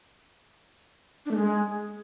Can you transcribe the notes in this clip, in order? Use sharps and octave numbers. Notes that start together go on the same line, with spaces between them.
D4
A3
G#3